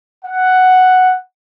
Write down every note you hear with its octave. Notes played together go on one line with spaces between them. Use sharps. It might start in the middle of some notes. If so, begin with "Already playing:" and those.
F#5